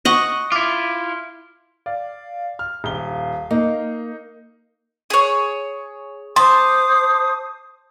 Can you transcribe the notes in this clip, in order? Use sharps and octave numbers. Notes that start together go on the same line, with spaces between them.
D#5 F#5 C#6
E4 F4 D6
D5 F5
F6
D#1 F5 G7
A#3 D#4
G#4 C#5
C5 A5 C6 D6 D#6